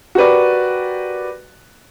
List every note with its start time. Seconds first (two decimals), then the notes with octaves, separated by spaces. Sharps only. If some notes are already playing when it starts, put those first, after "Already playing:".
0.15 F#4 G4 A#4 B4 D5